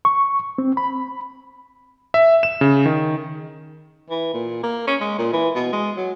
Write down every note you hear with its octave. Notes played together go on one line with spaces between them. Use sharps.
C#6
C4
B5
E5
E7
C#3
D#3
E3
A#2
A#3
C#4
G#3
A#2
E3
B2
G#3
F#3